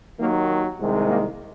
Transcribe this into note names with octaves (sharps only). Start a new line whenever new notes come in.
D#2 D#3 F#3 A#3
C2 C3 D#3 G#3
A#3